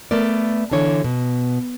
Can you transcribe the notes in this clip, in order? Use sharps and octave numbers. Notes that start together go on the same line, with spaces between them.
A3 B3 A#4 D5
D3 E3 D4 C#5
B2